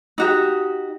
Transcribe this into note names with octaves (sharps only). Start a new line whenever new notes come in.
D#4 F#4 G4